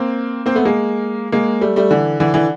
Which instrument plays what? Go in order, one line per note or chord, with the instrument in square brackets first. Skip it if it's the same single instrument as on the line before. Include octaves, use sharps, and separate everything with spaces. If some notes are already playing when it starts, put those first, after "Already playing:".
Already playing: [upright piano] A#3 C4
A#3 C4
A3 B3
G#3 A#3
G#3 A#3
G3 A3
G3 A3
D3 E3
D3 E3
D3 E3